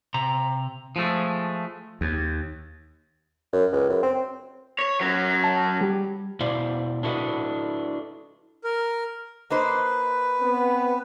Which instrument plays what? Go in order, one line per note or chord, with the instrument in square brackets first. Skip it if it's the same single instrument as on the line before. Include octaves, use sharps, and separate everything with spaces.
[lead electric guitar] C3 A#5
[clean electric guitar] F3 G#3 A3
[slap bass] D#2
[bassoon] F#2
C#2
F#2
C4
[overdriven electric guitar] C#5
F#3 C#4
[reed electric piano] A5
G3 G4
[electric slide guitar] B2 E4 C5 D5 F5
D4 E4 F#4 A4 B4 D#5
[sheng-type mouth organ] A#4
[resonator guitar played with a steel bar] A#3 D#4 C5 [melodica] B4
[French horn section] B3 C4